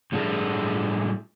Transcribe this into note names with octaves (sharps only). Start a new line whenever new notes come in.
A2 G3 C#4 D4 G#4 A4